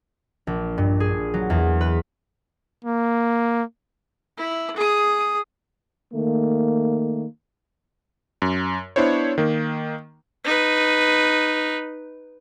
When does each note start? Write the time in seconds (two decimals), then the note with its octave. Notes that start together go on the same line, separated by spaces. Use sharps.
0.47 A#1
0.78 G2
1.00 G#4
1.34 F#3
1.50 E2
1.81 B4
2.85 A#3
4.37 E4
4.76 G#4 D#6
6.13 D#3 A3 A#3
8.42 F#2
8.96 B3 D4 E4 C5 C#5
9.38 D#3 A#3
10.44 D#4 B4